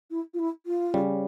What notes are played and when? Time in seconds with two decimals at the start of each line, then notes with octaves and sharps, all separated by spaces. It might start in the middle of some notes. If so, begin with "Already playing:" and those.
0.10 E4
0.33 F4
0.39 E4
0.66 F4
0.94 C#3 G3 C#4